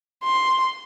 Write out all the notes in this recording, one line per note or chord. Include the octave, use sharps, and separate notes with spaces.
C6